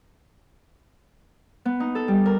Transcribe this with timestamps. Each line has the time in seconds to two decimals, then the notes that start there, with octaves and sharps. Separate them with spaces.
1.65 B3
1.80 D#4
1.95 A4
2.08 G3
2.26 A#4